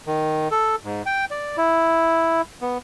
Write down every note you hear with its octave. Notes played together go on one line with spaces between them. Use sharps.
D#3
A4
G#2
G5
D5
E4
B3